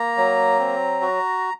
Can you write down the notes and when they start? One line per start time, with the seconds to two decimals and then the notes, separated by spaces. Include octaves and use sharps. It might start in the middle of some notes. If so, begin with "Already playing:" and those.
Already playing: A#3 A#5
0.17 F#3
0.59 C4
1.01 F#4